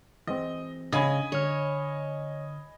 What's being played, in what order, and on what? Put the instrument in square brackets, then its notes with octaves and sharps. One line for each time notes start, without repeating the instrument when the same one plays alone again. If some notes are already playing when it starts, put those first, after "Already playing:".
[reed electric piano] E3 G#3 C4 [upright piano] D#5
[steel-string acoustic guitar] C#3 [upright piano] D#5 G#5 B5
[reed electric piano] D3 F6 [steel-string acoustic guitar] C#5